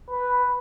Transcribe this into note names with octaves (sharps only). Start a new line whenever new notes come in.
B4